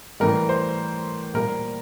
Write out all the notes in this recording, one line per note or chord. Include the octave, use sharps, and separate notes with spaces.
A2 E3 G3 A#4
C5
A#2 G3 A#4